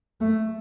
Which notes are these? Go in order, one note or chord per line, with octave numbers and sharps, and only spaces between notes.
A3